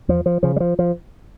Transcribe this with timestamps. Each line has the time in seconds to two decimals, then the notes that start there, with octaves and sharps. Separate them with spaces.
0.08 E2 F3
0.26 F3
0.43 C#3 F3
0.56 G3
0.60 F3
0.79 F3